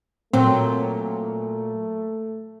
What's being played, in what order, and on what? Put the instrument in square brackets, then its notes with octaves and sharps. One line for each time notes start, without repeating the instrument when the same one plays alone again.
[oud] A#2 F#3 [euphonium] A3 [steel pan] C4